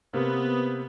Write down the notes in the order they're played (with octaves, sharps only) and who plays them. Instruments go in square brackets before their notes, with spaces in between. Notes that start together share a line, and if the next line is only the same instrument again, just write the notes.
[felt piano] C3 A#3 [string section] B3